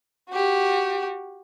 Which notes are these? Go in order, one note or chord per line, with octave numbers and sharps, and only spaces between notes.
F#4 G4